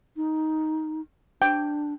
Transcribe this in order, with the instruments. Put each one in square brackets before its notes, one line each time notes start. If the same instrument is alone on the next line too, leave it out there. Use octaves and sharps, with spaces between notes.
[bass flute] D#4
[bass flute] D4 [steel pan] G5